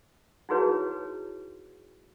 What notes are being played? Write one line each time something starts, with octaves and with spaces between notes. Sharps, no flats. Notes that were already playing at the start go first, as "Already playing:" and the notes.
D#4 E4 F#4 G#4 B4 C#5